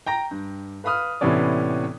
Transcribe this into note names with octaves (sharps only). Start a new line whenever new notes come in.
G5 A#5 A#6
G2
B4 F5 B5 D#6 F6
A2 C3 E3 B3 C#4 D5